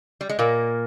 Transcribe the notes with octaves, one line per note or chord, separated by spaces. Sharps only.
G3
G#3
A#2 A#3 A#4